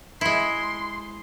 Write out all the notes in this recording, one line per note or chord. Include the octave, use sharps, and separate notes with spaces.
G#3 E4 C6